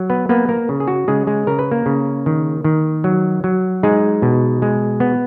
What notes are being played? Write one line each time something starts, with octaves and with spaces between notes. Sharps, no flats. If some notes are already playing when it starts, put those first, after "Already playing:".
Already playing: F#3
B3 B4
A#3 B3 B4
A#3 A#4
C#3
G#4
F#4
C#3 G#3 G#4
G#3 G#4
C#3 A#4
B4
A#3 A#4
C#3
D#3
D#3
F#3
F#3
G#3 D#4 G#4
B2
G#3
B3